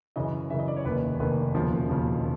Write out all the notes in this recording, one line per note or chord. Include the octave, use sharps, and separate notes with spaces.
F#2 C#3 E3 D#5
F#2 C#3 E3 E5
D#5
D5
C#5
F1 D#2 D#3 B4
F1 D#2 D#3 B4
E1 D#2 C#3 F3
E1 D#2 C#3 F3